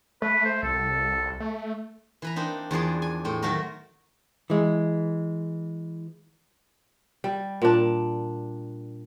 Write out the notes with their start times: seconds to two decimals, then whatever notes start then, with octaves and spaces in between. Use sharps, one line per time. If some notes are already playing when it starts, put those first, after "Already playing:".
0.22 A3 B4
0.45 C5
0.63 C2 A4
1.40 A3
2.22 E3 B4 A#5
2.36 A#3 C4 D4 D#4
2.71 E2 F3 G#4 D5
3.02 G#5
3.25 A2 C4
3.42 D#3 F#3 A3 F#4 A#4
4.50 E3 G#3
7.24 G3
7.62 A#2 D4